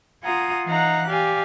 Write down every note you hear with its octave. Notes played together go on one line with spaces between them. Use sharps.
F4 F#5 G#5 A#5 D#6
E3 D#4 F5 F#5 A#5 F#6
G4 D5 F5 G#5